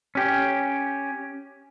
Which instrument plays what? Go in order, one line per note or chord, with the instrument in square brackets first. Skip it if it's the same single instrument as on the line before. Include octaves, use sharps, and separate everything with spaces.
[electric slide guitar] C#4 G4